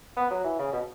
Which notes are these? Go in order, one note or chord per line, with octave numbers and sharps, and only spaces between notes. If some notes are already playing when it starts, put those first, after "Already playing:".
B3
F#3
E3
C#3
B2